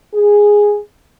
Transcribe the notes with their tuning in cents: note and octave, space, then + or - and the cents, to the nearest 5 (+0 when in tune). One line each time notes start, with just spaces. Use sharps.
G#4 -5